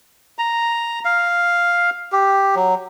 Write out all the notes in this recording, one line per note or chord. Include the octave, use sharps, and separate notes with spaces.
A#5
F5
G4
F#3